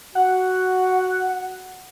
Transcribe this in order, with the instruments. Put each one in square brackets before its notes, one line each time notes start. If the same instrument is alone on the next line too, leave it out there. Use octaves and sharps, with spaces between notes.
[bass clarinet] F#4 [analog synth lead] F#5